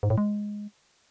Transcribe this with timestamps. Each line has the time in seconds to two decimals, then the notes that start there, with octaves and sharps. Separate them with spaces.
0.03 G#2
0.10 A2
0.18 G#3